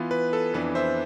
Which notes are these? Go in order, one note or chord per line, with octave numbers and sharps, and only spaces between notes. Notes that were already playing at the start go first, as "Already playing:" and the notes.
Already playing: E3 B3 F4
B4
A4
F2 E3 B3 D4 B4
C5 E5